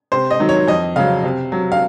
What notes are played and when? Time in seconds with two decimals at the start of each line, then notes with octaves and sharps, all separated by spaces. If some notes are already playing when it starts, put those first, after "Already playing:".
0.12 C3 C5
0.31 D#5
0.40 D#3 F#3
0.49 C#5
0.68 F2 D#5
0.96 C#3 F#3 F5
1.24 C3
1.52 F#3
1.72 F5